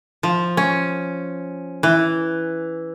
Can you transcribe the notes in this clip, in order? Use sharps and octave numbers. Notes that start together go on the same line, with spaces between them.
F3
C#4
E3